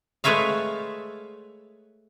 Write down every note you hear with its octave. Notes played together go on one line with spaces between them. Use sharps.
G#3 A3 B4 C#5 E5 F5